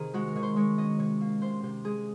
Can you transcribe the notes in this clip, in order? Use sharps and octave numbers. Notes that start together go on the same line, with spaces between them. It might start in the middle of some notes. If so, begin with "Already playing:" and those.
Already playing: C3 D#3 G#4 A#4 C5
G#3 F#4
A#4
D#3 C#5
C5
G#3 C#5
C#4 D#5
C3 C#5
A#3
C3 C5
C3 C5
G#3 G#4